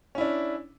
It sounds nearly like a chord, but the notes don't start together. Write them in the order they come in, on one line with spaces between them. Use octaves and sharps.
C#4 E4 D4